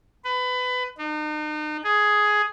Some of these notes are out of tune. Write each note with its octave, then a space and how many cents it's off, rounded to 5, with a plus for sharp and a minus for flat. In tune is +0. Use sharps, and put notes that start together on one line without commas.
B4 +25
D#4 -40
G#4 +10